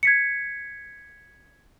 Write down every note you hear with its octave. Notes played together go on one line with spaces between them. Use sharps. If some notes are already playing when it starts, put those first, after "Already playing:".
G#6 B6 C#7